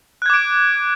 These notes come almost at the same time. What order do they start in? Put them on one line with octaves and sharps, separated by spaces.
F#6 G#6 D6 D7